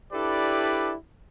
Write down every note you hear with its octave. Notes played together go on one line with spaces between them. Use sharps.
D4 E4 G4 A4 B4 D5